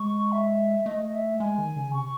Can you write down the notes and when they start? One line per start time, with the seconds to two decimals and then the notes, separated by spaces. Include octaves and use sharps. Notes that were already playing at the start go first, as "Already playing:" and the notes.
Already playing: G#3 C#6
0.32 E5
0.86 A3 D#5
1.05 D#5
1.14 E5
1.40 G#3 G#5
1.58 D#3
1.76 C#3
1.94 C3 C#6